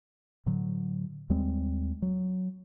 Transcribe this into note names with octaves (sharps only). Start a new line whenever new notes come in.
A2 D3 F#3
D#2 G3 G#3 C4
F#3